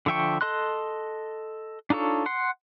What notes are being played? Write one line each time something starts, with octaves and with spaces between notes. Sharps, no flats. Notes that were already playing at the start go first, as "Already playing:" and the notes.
D3 F3 E5 G5 C#6
A4 D#5 C6 F#6
D4 D#4 F4 A4 C#5
F#5 C6